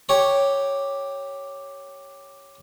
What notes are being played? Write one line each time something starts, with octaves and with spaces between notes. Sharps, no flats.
G4 C#5 A#5